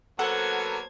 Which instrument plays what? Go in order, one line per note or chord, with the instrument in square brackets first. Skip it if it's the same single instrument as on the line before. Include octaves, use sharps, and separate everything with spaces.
[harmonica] F#3 A#3 B3 [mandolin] A4 [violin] C5 G#6 [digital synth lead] F#5